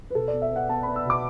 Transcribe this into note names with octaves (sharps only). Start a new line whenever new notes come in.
B4
B2 A4
D5
B3
E5
B3
F#5
B3 A5
B3 B5
E6
B2 D6